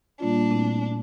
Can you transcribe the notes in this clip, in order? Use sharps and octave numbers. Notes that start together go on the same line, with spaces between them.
A#2 G3 A#3 D4 F4
A#2 A3 C4 E4